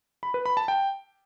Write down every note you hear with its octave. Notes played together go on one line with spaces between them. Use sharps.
B5
B4
B5
A5
G5